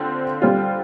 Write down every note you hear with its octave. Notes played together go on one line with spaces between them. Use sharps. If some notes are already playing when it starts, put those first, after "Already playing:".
Already playing: D3 C4 F4
D3 G3 C4 F4